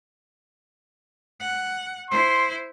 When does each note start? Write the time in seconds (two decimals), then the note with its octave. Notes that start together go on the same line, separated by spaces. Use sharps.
1.40 F#5
2.10 E4 C5 C6